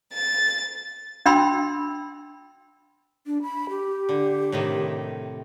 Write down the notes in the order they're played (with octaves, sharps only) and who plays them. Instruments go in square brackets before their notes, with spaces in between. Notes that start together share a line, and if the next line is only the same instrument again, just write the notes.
[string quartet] A6
[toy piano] D4 G5 B5 C6 E6
[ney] D4
B5
G4
[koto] D3
A2 C3 D#3